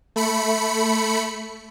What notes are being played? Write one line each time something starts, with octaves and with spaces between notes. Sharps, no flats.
A3 B5 C#7